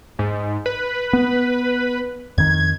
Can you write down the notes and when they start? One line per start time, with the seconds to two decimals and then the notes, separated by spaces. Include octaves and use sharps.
0.19 G#2
0.66 B4
1.13 B3
2.38 F2 D#3 G#6